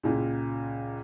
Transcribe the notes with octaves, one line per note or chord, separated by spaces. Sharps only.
C#2 A#2